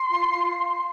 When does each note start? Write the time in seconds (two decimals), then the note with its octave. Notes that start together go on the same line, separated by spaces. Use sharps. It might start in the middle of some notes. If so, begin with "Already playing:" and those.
Already playing: C6
0.09 F4
0.34 F4